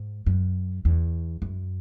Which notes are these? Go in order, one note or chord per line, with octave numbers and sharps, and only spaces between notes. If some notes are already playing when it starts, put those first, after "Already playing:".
Already playing: G#2
F#2
E2
F#2